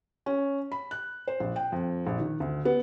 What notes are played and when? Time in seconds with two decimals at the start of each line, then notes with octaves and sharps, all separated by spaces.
0.26 C#4
0.72 B5
0.91 F#6
1.28 C5
1.40 A#1
1.56 G5
1.72 F2
2.07 A#1
2.19 D#3
2.40 D2
2.65 B3